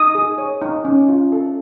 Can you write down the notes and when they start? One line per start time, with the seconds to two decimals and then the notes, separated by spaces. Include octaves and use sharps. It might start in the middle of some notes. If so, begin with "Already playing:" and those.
Already playing: D#4 D#6
0.15 G#4
0.38 C#5
0.62 D#4
0.85 C#4
1.09 F4
1.32 A4